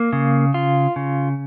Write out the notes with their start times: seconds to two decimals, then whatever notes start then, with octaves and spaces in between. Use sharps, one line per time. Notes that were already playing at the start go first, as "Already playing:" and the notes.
Already playing: A#3
0.13 C#3
0.54 F4
0.96 C#3